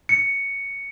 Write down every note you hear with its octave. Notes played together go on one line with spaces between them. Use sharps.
C#7